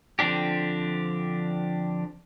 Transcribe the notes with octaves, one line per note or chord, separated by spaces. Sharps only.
D3 F3 C4 D4 G4